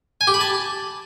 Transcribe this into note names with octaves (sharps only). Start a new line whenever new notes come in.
G#5
G4
B5
A5